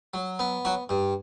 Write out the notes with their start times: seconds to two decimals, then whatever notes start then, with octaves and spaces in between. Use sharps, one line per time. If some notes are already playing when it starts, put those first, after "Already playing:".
0.14 F#3
0.39 B3
0.65 F#3 F#4
0.89 G2